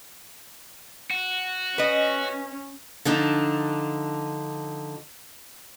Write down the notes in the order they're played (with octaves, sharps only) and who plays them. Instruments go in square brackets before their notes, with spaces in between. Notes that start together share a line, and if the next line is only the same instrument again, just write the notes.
[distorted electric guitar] F#4
[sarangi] C#4 [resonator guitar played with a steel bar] B4 D#5
[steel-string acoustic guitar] D3 F3 D4 D#4